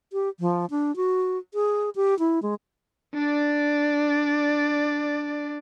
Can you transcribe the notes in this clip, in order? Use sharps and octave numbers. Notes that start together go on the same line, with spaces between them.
G4
F3
D4
F#4
G#4
G4
E4
G#3
D4 D5